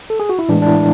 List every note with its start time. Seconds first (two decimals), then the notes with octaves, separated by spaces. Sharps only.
0.10 A4
0.20 G#4
0.29 F#4
0.39 E4
0.49 A2 E3 G#3 D4
0.62 D4
0.67 E4